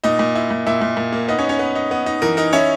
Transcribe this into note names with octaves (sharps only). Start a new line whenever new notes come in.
A#2 D#4 D#5
A#2
E4
A#2
A#2 E4 E5
A#2
A#2
A#3
B3 D#4 D#5
C#4 C#5
D#4
C#4 C#5
B3
D#4
B3
D#4
E3 A#4
D#4 A#4
C#4 E4 C#5